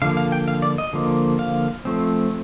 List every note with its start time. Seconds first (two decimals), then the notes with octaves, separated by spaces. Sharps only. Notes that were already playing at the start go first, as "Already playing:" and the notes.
0.02 D3 F3 A#3 F5
0.17 F5
0.32 G5
0.48 F5
0.62 D5
0.78 D#5
0.93 D3 F3 A#3
1.39 F5
1.85 F3 A3 C4